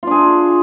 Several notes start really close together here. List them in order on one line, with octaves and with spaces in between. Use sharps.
F4 D4 G#4